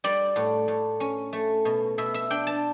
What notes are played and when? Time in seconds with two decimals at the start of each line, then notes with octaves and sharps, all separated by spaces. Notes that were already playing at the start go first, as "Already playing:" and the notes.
0.04 G3 D5
0.36 A2
0.68 A2
1.00 C#4
1.33 A3
1.65 B2
1.98 B2 E5
2.14 E5
2.30 D4 G5
2.47 A5